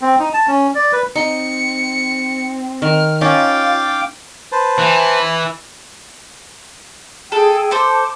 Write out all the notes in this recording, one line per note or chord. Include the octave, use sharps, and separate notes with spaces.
C4
D#4
A5
C#4
D5
B4
C4 D#4 C6 C#7
D#3 F6
C#4 D#4 F4 F5 G5 D6 A6
B4 C5 A5
E3
G#4 A4 G5
A4 C5 A5 D6